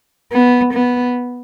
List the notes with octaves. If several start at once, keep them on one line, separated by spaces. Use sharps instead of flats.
B3
B3